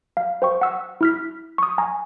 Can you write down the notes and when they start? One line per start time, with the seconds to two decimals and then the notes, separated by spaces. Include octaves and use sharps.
0.17 F5
0.42 C5 G5 C#6
0.61 F#5 E6
1.01 E4 F6 B6
1.58 C#6 D#6
1.78 G#5 A#5